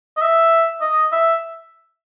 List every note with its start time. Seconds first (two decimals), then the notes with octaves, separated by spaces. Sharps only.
0.17 D#5
0.22 E5
0.81 D#5
1.12 E5